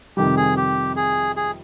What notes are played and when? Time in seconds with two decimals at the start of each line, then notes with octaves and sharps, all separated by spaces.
0.17 F2 C3 D#3 G3 G4
0.37 G#4
0.57 G4
0.96 G#4
1.37 G#4